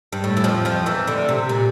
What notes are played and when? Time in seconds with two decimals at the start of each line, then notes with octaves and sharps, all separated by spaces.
0.12 G2
0.24 A2
0.37 E3
0.44 F2 F3
0.65 F2 F3
0.86 E2 E3
1.07 D2 D3
1.29 C3
1.49 A#2